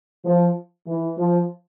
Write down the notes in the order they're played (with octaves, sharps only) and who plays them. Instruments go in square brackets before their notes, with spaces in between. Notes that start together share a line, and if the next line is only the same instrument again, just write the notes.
[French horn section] F3
E3
F3